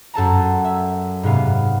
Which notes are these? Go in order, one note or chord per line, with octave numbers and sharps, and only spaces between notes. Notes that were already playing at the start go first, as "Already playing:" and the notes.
F#2 A4 A5 A#5
E5
G#2 C3 B3 F5